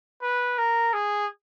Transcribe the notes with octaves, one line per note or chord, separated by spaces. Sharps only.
B4
A#4
G#4